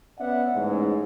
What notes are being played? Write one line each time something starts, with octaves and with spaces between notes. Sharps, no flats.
B3 C#4 D5 E5 F#5
A1 G#2